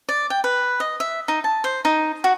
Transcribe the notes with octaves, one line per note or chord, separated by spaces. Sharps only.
D5
G5
B4
D#5
E5
D#4
A5
C5
D#4
F#4